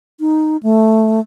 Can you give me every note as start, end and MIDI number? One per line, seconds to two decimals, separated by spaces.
0.20 0.57 63
0.63 1.20 57